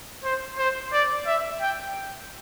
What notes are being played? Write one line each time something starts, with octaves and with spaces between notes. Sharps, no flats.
C5
C5
D5
E5
G5